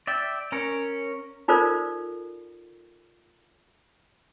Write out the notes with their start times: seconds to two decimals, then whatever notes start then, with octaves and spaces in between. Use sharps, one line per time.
0.07 D5 E5 G5
0.52 C#4 A#4 C#5
1.48 D#4 F4 A4 A#4 C5 D5